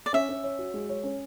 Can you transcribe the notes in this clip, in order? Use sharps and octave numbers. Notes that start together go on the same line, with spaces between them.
D5
C#4 E5
C#4
C#5
F#4
G#3
C#5
C#4